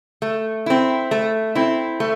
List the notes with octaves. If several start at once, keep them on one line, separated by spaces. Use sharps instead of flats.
A3
C4 E4
A3
C4 E4
A3